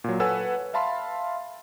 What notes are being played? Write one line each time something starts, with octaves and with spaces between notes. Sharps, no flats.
A#2 F#3
A4 B4 C#5 F#5 G#5 E6
E5 F5 A5 B5 C6